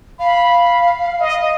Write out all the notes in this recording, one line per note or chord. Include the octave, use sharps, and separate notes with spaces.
F5 B5
D#5